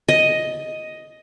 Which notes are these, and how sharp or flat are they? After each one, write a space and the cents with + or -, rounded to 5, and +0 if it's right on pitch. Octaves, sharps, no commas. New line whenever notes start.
D#5 +5